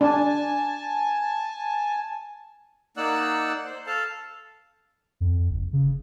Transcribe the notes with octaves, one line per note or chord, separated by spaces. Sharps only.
D4 G#5 A5
A#3 D#4 D5 F#5 E6 F#6
C5
A4 F5 A5
F2
F#1
C#3